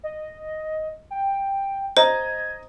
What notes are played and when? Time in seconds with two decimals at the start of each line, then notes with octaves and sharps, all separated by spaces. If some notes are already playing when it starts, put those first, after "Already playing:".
0.04 D#5
1.11 G5
1.97 C5 D#5 A#5 G#6